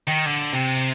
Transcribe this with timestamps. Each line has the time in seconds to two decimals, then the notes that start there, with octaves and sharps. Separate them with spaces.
0.08 D#3
0.26 D3
0.53 C3